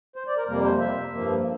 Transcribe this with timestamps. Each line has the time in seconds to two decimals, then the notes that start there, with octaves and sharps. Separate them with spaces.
0.16 C5
0.27 D5
0.37 A#4
0.48 F2 C3 G3 A#3 A#4
0.64 C5
0.80 E5
1.13 G2 F3 A#3